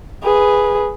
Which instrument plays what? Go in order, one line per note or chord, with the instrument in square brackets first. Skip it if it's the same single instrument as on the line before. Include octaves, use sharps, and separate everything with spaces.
[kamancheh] G#4 B4